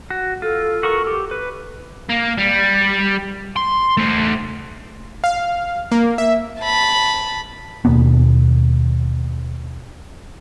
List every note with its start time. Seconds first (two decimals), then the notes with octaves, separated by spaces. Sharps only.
0.10 F#4
0.42 F4 A4
0.83 F#4 A#4 C#6
1.07 G4
1.31 B4
2.09 A#3
2.38 G3
3.56 C6
3.97 A3 C5
5.24 F5
5.92 A#3
6.18 E5
6.60 A5 B5
7.85 D#2 B2 A#3 B3